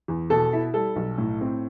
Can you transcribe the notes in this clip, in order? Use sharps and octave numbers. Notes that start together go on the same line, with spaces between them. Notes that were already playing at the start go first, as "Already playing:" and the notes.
E2
B2 A4
E4
G3 A4
B1
A2
C4